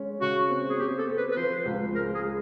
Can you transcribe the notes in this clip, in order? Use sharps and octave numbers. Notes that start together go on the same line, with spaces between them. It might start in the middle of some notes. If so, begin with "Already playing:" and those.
Already playing: G#3 C#4
C#3 F#4
C4
G#4
C4 G4
A4
C4
B4
B4
F3 C5
C#2
G#3 A#4
G#4
G#3